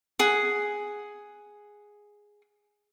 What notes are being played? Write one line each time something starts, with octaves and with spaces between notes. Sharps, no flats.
G#4 F#5